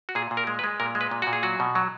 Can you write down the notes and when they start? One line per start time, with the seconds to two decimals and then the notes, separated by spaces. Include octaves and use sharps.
0.09 F#4
0.15 A#2 G#4
0.31 A#2
0.37 A#4
0.47 G#3
0.59 B4
0.64 G#3
0.80 A#2 A#4
0.95 G#3
1.01 B4
1.11 A#2
1.22 A#2 F#4
1.33 G#4
1.43 F#3 F#4
1.60 B2
1.75 F#3